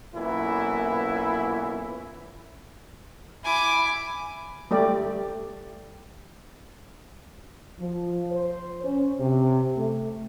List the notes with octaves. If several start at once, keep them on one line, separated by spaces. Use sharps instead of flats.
B1 A#2 E3 C#4 E4
E4 G#5 D6
G3 A3 G4 D5
F3
C5
C#4
C3
A3